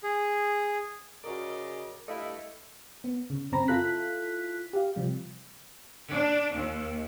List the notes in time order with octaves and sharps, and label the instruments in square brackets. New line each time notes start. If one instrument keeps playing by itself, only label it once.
[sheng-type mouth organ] G#4
[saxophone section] C#3 D5 D#5 [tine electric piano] F#4 A#4
[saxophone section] G2 A3 E4 [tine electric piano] D#5 F5
[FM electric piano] B3
C#3
F#2 C#3 C4 A#5 B5 A#6
E4 F4 A4 F#6 B6
G4 F5
C3 F3 G3
[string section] D4
D#2